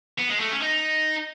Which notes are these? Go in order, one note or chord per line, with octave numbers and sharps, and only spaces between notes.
B3
G#3
A3
C#4
D#4